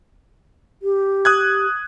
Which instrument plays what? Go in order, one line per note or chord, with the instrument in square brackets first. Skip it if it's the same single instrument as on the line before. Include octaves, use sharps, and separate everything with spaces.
[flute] G4
[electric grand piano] D#6 F#6 G#6